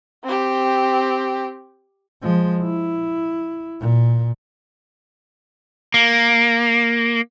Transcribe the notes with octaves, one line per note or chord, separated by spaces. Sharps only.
C4 G4
F3 G#3
E4
A#2
A#3